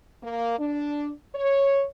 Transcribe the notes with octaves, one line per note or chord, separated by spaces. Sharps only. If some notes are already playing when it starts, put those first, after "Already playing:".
A#3
D4
C#5